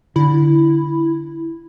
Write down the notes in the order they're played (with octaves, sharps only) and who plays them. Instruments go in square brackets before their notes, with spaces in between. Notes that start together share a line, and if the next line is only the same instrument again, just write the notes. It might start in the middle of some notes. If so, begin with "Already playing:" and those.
[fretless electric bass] D3 [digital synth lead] E4